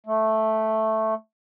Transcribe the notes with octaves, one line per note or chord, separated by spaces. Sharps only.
A3